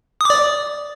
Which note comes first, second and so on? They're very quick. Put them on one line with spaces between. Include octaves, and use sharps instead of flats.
D#6 D6 D5